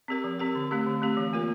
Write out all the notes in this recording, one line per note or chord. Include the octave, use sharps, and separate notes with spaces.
C4 G4 A#4
F3
C4 G4 A#4
D3
A3 C4 G4
D3
A3 C4 G4
E3
A#3 F4 A#4